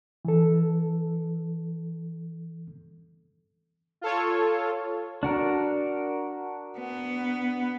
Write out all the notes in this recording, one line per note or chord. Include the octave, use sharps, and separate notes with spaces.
E3 A4
F4 A4 C#5
D4 F#4 A#4
B3